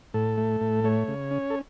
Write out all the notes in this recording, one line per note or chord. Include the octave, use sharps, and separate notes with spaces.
A2 A4
A3
A2
A3 C#5
C#3
C#4
A4